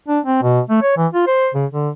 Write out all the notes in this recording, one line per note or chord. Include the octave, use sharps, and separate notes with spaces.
D4
C4
B2
A3
C#5
E3
F4
C5
C#3
D3